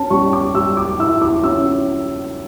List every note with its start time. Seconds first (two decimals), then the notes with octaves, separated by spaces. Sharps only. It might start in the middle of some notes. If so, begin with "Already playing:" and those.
Already playing: C#4 A5
0.10 G3 C#6
0.33 D6
0.55 G3 E6
0.77 D6
0.99 E4 E6
1.22 D6
1.44 C#4 E6